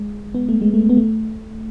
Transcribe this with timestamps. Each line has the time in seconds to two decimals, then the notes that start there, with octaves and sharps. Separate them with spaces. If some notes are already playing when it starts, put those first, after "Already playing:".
Already playing: G#3
0.35 B3
0.49 A3
0.61 G#3
0.74 A3
0.89 B3
0.97 A3